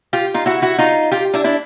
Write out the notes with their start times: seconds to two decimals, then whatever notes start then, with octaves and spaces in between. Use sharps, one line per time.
0.13 F4 G4
0.34 D#4 F4
0.46 E4 F#4
0.62 E4 F#4
0.78 D#4 F4
1.12 F4 G4
1.34 D4 E4
1.44 D4 E4